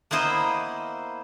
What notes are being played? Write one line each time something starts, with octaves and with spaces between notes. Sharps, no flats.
A#3 B3 E4 C5 D#5